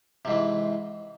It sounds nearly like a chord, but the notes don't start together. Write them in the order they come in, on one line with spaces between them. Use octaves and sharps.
C3 G#2 E3